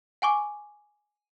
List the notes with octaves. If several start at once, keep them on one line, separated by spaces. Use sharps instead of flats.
F#5 G#5 C#6 D6